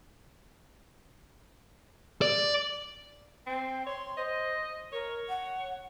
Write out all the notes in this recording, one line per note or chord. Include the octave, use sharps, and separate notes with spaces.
D5
C4 G5
C#5 C6
C5 D#5
A#4 C#5
F#5